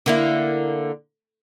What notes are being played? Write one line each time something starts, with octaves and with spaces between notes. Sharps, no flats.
D3 A#3 E4